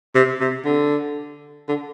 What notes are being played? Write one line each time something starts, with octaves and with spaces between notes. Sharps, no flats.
C3
C3
D3
D3